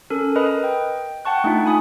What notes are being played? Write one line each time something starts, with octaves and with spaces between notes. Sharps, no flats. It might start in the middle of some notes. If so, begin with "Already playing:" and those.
C#4 A4 A#4
A#4 B4 D#5 B5 D#6
G5
F#5 G5 A5 C#6 F#6
A3 D4 D#4 F4
G#5 B5 D#6